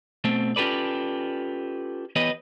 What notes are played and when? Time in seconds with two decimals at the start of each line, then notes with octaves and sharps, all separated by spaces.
0.24 B2 A3 C4
0.56 C#4 F4 G4 A4 B4 D5
2.16 E3 B3 G4 B4 C#5 D#5